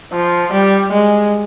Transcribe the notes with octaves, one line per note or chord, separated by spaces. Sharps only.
F3
G3
G#3